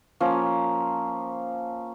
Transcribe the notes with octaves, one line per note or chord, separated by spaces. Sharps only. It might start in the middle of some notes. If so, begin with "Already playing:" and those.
F3 A#3 C#4